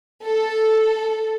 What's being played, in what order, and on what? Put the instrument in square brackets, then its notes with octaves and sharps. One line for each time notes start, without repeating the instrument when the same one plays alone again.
[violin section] A4